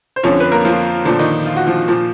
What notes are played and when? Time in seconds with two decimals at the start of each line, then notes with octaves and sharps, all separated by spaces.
0.16 C5
0.23 F2 D3 F3 C#4 C#5
0.40 B4
0.52 A#3 A#4
0.65 F3 F4
1.05 A#2 D3 F3 D4
1.19 D#3 D#4
1.46 F4
1.56 F#4
1.67 F3 F4
1.88 A#2 F3